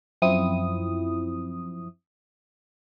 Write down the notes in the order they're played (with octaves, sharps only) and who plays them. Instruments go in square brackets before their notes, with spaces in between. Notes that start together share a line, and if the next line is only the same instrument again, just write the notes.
[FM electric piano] F#2 F3 C4 E4 D#6